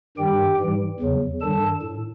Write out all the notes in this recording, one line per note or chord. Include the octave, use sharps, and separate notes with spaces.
G2 D#3 G3 G4 G5
G#2 E3 G3
E2 C#3 F#3
G2 D#3 G3 A4 A5
A2